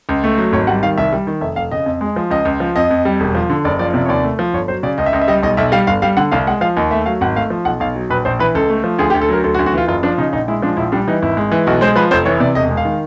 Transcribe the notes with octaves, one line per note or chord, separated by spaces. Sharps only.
C#2
A3
F#3
G#1 C#5
G3 F#5
D#3 F5
C2 E5
G3
D#3
F1 E5
F1 F5
C#3 D#5
F2
G#3
F3
C#2 D#5
C#2
F3
F2 D#5
F2
G3
E1
F3
D3
F#1 D5
F3 D5
C3 D5
C#5
D#2 D5
A3
F3
G1 C#5
F#3 C5
C#3 D5
C#2 D#5
E5
C#2 D#5
E5
G3 D#5
B1 D#5
B1 E5
G3 F5
G1 F5
G3 F5
D3 F#5
C2 F5
G#3 F#5
F3 F5
D#2 D#5
A3 E5
F#3 F5
G#1 F#5
A3 F5
F3
B1 F#5
B1 F5
F#3
A#1 B4
A#1 C5
E3 B4
C#2 A4
A3
F3
D2 G#4
G4
D2
A4
F#3 A#4
D2 A4
F#4
D2
F#4
E3 F4
F#1 F4
F3 D4
C#3 D#4
A#1 D#4
G#3 E4
F3 D4
A#1 E4
G3 D4
E3 D#4
G#1 E4
G#3
E3
B1 F#4
G#3 C5
F3 B4
F1 C5
E3 C#5
C3 D5
E1 D#5
G#3
F5
D#3